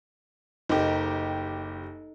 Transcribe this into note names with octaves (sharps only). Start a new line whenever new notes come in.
F#1 D#4 G4 A4